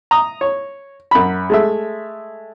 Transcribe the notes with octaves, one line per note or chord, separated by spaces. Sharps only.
A#5 D#6
C#5
F#2 B5
G#3 A3 E5